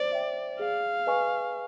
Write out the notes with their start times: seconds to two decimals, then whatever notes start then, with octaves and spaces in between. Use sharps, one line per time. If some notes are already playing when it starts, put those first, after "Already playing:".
Already playing: C5 D5
0.12 E5 G5
0.59 G#4 F5
1.07 B4 D#5 G#5 C#6